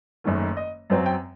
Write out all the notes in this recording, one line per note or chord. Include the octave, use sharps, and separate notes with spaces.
F#1 F#2 D#3 A3
D#5
F#2 F#3 C4
G5